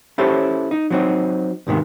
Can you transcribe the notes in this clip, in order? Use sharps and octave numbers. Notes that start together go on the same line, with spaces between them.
C#4 E4 G4 A4 C5 C#5
D#4
F#3 C4 D#4
D2 G#2 C3 D#3 B3